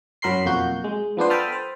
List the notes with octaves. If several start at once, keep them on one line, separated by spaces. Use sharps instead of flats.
F#2 F#3 A#4 B5 C6 C7
B1 F2 A#3 F#4 G6
G#3
F3 B3 D4 C5
A4 G5 A5 B5 D#6 F6
C5